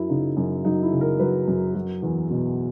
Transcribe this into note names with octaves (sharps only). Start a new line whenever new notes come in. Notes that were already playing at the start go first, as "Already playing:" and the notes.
Already playing: F#2 F#3 E4
C#3 D#4
F#2
F#3 D#4
E4
C#3
A#4
F#3 B4
F#2
F#3
E2
B2